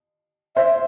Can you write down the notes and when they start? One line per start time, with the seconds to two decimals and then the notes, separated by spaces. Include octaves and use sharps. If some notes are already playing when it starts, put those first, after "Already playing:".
0.56 C5 E5